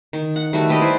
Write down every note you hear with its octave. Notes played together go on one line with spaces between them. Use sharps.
D#3
F#5
D#3 G3 A3 F#4
G4 B4 D5 D#5
E4 C5